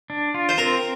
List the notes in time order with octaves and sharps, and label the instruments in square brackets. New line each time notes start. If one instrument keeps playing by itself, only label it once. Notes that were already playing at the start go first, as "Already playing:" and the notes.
[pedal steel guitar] D4
F4
[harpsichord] C5
[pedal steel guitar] C4 [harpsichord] A#4